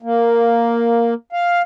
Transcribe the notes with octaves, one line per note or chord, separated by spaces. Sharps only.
A#3
F5